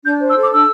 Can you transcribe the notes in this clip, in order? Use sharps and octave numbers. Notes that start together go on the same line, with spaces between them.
D4 G6
C5
E6
A4
D6
D4 E6